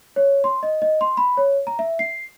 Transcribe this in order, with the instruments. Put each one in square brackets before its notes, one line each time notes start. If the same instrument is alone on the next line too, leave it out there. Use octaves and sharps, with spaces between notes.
[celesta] C#5
C6
D#5
D#5
C6
B5
C#5
A#5
E5
C7